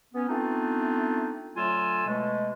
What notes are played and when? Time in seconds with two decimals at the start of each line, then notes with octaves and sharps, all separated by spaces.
0.14 B3 C#4
0.29 A3 B3 C4 D4 D#4 F4
1.57 D3 F#3 A3 F4 G#5 E6
2.06 B2 G#3 A3